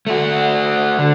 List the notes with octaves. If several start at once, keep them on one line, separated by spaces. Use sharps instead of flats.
A3 F#4
D3